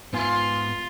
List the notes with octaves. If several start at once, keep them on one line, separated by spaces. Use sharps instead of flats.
G#2 B3 F4 G#5